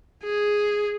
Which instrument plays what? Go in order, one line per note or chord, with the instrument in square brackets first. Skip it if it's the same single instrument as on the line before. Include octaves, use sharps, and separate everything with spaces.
[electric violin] G#4